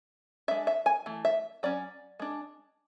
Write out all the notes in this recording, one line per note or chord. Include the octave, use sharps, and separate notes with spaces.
G#3 D4 E5
E5
G#5
E3 A3
E5
F#3 C#4 D5
G#3 D4